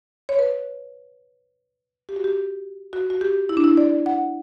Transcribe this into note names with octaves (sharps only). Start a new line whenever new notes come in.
C#5
B4
G4
F#4
G4
F#4
F#4
G4
E4
D4
E4
D5
F#5